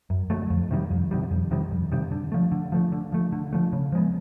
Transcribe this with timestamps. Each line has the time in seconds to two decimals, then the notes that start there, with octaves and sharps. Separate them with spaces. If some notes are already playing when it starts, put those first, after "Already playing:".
0.10 F#2
0.30 D3 F#3 A3
0.50 F2
0.71 C3 D#3 G3
0.91 F2
1.11 C3 D#3 G3
1.31 F2
1.51 C3 D#3 G3
1.71 F2
1.92 C3 D#3 G3
2.12 D3
2.32 F3 A3
2.52 D3
2.72 F3 A3
2.92 D3
3.12 F3 A3
3.33 D3
3.53 F3 A3
3.73 C#3
3.92 F3 G#3 B3